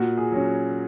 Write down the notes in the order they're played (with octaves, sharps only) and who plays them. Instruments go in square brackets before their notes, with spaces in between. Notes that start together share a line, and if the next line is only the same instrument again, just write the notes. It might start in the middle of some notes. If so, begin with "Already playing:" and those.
Already playing: [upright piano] A#2 F#4
G#4
F#3 C#4